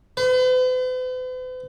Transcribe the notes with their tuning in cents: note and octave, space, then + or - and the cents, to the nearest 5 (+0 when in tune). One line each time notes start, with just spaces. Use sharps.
B4 +45